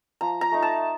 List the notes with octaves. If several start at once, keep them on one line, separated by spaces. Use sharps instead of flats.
F3 A#5
A#5
A3 D#4
A5